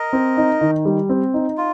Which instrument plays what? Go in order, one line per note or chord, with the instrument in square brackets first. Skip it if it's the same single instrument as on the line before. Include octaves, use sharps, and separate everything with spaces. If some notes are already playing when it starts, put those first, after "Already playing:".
Already playing: [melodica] A#4 D#5
[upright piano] C4
D#4
D#3
G3
C4
D#4
[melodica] F4